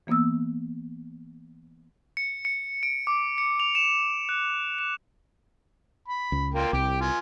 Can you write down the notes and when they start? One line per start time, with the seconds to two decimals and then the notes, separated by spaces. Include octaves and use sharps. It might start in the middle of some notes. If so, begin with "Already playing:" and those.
0.07 E3 A#3 B3 D#6 E6
2.17 C#7
2.45 C#7
2.83 D7
3.07 D6
3.38 C#7
3.60 F7
3.75 E7
4.29 F#6
4.79 E7
6.08 B5
6.32 C#2
6.54 A#3 F4 G5
6.73 C2 G5 D6
7.01 F4 G#5